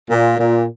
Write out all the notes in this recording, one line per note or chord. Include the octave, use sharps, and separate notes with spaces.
A#2
A#2